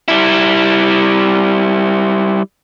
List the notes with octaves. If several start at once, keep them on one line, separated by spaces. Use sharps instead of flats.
G3 E4